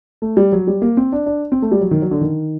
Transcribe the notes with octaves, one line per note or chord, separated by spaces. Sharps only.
A3
G3
F#3
G3
A#3
C4
D4
D4
C4
A3
G3
F#3
D#3
F#3
D3
D#3